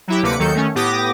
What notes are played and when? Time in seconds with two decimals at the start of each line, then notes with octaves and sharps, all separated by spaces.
0.08 F#3 E4 G4
0.22 D2 C3 A#3 B4 D6 C#7
0.39 D#2 D#3 F#3 A4 G6 C#7
0.54 D#3 A3 C#4
0.75 A2 B3 G4 D6 D#6 A#6